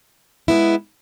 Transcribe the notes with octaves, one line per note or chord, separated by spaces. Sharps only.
G#3 B3 E4